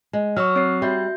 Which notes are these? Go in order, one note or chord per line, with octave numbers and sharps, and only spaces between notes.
G#3
F#3 C#6 E6 F6
C4 C#5 C7
G3 F#4 E5 G6